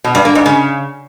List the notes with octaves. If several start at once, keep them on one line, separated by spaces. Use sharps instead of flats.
B2
G2
A#3
G#2
C#3